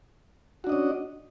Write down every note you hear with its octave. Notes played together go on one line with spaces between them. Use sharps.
C#4 D4 F#4 D#5